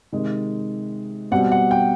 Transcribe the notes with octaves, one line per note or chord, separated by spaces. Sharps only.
C3 D#3 G#3
B2 G3 C4 F#5
F#5
G5